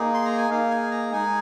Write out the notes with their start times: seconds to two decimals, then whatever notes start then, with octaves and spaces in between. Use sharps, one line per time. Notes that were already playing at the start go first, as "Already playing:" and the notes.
Already playing: A#3 D#4 G#4
0.14 C6
0.25 A#5
0.38 G#5
0.50 A#3 D#4 G#4 F5
0.71 G#5
0.91 A#5
1.12 G#3 D#4 G#4 G#5